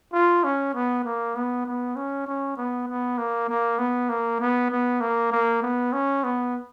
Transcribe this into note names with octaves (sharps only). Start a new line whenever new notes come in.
F4
C#4
B3
A#3
B3
B3
C#4
C#4
B3
B3
A#3
A#3
B3
A#3
B3
B3
A#3
A#3
B3
C#4
B3